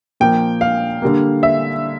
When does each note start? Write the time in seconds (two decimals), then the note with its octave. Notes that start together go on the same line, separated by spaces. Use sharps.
0.20 A#2 F3 A#3 G5
0.61 F5
1.02 D3 G3 A#3
1.43 E5